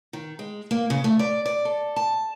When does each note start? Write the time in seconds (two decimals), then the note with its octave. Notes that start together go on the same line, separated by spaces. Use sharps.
0.13 D#3
0.39 G#3
0.71 A#3
0.90 C#3
1.04 A3
1.19 D5
1.46 D5
1.65 A4
1.96 A5